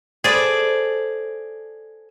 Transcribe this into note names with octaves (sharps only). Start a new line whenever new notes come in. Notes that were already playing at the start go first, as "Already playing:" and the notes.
G#4 A4 B4 C5 D5